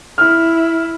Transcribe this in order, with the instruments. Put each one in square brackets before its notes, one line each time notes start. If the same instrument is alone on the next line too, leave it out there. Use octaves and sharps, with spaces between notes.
[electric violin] E4 [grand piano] F6